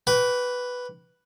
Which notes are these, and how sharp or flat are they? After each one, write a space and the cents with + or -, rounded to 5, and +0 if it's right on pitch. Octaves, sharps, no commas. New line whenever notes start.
B4 +0 G5 -25 D6 -40